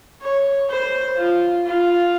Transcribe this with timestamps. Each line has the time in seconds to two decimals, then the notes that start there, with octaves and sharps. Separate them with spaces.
0.21 C#5
0.69 C5
1.17 F4
1.66 F4